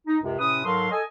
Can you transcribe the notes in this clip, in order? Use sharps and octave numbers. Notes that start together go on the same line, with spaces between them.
D#4
C#2 F#2 C3
A2 C3 C#4 B4 D#6
G#2 F#3 A4 A#4 F5 C6
A4 D#5 G#5